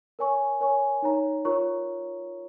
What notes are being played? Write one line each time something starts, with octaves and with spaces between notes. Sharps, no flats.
A#4 C#5 G#5 C#6
A#4 C#5 G#5 C#6
D#4 C#5 A#5
F4 A#4 C#5 A#5 C#6